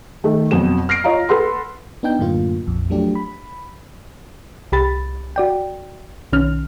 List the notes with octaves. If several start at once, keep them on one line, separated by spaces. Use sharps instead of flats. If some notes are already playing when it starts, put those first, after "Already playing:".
D#3 A3 A4
F2 B2 F#3 E7
F6 A#6 C7 D7
F4 C#5 D#5 F5 A#5
A4 B4 F#5 B5 C6
B3 D4 D#4 G5 G6
F#2 A2 D3 A#3 F4
A#1 F2
F3 F#3 A3 D4 G4
B5
C2 G4 B5 A6
F#4 D5 G5
B1 D#3 C#4 F6